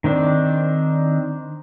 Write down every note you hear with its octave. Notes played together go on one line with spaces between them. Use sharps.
D#3 C4 D4